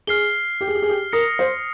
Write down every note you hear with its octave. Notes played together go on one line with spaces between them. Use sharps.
G#4 F6 C7 G7
G4
G#4
G4
G#4
G4
A#4 D#6 A#6 C#7
C5